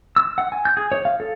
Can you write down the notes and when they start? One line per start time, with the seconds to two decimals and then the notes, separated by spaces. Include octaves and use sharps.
0.16 E6
0.38 F#5
0.52 G#5
0.65 G6
0.77 G#4
0.92 C#5
1.05 F5
1.20 A4